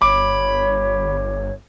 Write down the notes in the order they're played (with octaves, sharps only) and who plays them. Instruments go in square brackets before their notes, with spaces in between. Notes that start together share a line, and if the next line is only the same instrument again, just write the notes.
[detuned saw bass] G1 [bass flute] C#5 [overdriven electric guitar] B5 [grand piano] D6